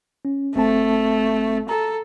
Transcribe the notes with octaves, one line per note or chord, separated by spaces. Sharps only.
C#4
G1 A3 C4 A5
A4 A#5